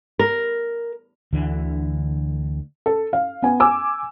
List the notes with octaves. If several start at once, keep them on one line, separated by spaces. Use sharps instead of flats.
A#4
D2 D3 E3
A4
F5
B3 G#5
G#5 D6 E6